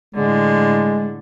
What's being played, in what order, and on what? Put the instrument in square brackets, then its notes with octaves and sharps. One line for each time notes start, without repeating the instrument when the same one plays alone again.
[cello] A2 D3 [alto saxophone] G#3